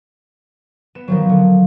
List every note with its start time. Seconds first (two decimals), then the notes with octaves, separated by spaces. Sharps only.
0.95 B3 E7
1.08 D#3 F3 F#3
1.29 D3